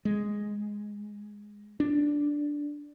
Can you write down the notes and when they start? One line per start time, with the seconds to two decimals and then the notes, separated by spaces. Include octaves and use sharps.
0.05 G#3
1.80 D4